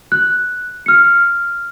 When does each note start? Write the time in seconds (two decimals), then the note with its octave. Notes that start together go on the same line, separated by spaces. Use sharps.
0.12 F#6
0.86 F6 C#7